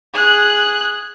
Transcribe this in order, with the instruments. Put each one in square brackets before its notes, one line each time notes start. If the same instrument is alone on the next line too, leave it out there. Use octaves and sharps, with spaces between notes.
[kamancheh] G#4 F#6